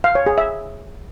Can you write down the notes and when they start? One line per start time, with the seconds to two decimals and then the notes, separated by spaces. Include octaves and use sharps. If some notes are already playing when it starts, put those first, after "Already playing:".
0.04 F5
0.15 C#5
0.26 G#4
0.38 E5